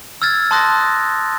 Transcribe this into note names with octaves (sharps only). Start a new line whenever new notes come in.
E6 F6 G#6 A6
A5 C6 D#6 F#6 A6 A#6